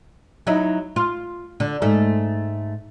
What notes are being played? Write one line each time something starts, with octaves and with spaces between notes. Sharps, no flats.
F#3 D#4 E4
F4
D3
G#2 A3